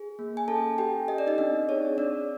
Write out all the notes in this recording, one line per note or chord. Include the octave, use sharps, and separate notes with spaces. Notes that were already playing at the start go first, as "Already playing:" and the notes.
Already playing: G#4
A#3
G#5
C#4 A4 A5
G4 A4 G5
C#4 D#5
D5
D#4 D#5
C4 D4 D5
G#4 C#5
C4 D4 D5